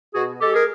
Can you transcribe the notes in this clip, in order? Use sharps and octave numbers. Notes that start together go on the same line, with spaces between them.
B2 F#4 G#4
G#3 G4 A4
G#4 A#4